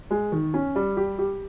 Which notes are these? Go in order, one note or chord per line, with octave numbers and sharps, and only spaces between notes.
G#3
D#3
C#4
G3
G4
G4